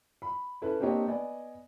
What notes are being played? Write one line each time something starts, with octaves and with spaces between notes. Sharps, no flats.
B5
C#4 E4 A4 B4
A#3 C4 D4 G4 C#5 D#5
B3 D5 D#5 G#5